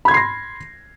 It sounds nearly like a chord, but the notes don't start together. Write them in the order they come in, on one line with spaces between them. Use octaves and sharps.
B5 G#6 C6 C7 A#6